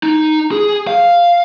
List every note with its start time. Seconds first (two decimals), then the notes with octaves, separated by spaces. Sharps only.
0.03 D#4
0.52 G#4
0.87 F5